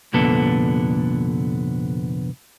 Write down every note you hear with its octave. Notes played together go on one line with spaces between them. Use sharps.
C2 F2 A#2 D3 B3 A4